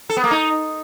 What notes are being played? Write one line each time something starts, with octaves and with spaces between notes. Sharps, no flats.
A4
B3
A#3
D#4